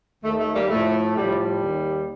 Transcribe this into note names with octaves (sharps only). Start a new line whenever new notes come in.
D#2 D#3 A3
A3
G3 A#3
A2 F3 A3
A2 F3 G3
G3
D#2 D#3